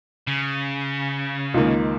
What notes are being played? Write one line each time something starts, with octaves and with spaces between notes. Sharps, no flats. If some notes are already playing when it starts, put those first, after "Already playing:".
C#3
C#2 D#3 A#3